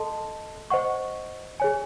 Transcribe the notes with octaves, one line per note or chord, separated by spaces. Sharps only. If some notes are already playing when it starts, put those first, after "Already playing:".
Already playing: A4 D#5 A5 C6
C5 D#5 F#5 C#6
G#4 C#5 G#5